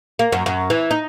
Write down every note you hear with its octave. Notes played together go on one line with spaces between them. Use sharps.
A#3
F#2
F#2
E3
D#4